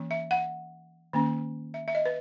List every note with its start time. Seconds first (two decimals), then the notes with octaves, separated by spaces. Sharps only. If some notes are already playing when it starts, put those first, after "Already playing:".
Already playing: E3 A#3 C#4
0.11 E5
0.31 F#5
1.13 D#3 A#3 C#4
1.74 E5
1.88 E5
1.95 D#5
2.06 B4